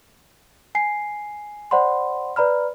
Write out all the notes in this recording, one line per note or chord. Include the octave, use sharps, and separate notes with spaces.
G#5 C7
C5 D5 F#5 B5 C6
B4 D5 A#5 B5 F6